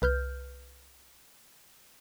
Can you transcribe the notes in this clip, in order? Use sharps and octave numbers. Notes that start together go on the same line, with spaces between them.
C2 B4 F6 G6